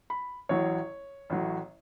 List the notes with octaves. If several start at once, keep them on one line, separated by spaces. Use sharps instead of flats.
B5
A1 A2 F#3 C#5
A1 A2 F#3